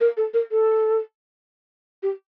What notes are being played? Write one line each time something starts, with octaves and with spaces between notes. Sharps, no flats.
A#4
A4
A#4
A4
G4